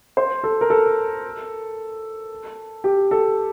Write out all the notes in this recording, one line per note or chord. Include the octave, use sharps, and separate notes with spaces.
C5
A4
A#4
A4
G4
A4